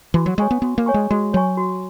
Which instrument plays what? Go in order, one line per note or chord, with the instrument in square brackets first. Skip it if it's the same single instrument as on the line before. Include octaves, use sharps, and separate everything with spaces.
[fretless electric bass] E3 [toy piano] F#4
[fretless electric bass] F#3
[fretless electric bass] G#3 [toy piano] C#5 G#5 C#6
[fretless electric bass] B3
[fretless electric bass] B3 [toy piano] F#4
[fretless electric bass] A#3
[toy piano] C#5 G#5 C#6
[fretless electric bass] G#3
[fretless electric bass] G#3 [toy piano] F#4
[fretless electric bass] F#3 [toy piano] C#5 G#5 C#6
[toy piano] F#4